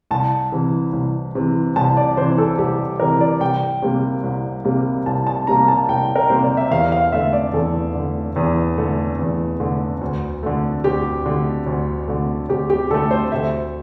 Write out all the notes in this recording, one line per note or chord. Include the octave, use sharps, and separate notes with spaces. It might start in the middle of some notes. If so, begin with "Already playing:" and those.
C2 A5
C3 E3
C2
C3 E3
C2 A5
D5
C3 E3 C5
A4
C2 G4
C3 E3 A#4
D5
C2 G5
C3 G3 A#3
C2
C3 G3 A#3
C2 A5
A5
C3 G3 A#3 A#5
A5
C2 G5
A#4
C3 G3 A#3 C5
D5
E5
E2 F5
F5
D3 A3 E5
D5
E2 A4
D3
A3
E2
D3 A3
E2
D3 A3
D2
D3 A3
D2 G4
D3 A3
D2
D3 A3
D2 G4
G4
D3 A3 A4
C5
D2 E5